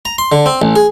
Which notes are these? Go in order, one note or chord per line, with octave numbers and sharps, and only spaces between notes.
A#5
C6
D3
C4
A1
G#4